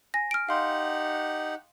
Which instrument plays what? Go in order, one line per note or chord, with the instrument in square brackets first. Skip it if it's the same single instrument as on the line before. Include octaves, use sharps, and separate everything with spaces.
[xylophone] G#5 A#6
F6 D7
[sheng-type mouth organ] D#4 G4 F#5 [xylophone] F5 C6